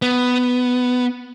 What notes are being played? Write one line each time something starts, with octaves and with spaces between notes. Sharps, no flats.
B3